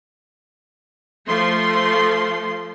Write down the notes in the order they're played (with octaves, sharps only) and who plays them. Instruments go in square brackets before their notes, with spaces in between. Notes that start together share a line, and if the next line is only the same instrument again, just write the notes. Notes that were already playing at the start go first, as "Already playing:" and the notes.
[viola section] F3 A3 C6